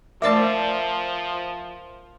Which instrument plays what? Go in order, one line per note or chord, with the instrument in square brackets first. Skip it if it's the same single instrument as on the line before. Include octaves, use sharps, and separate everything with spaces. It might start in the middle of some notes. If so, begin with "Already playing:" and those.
[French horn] F3 [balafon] A3 D5 D6 [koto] A#4 C5 A5 [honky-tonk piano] E5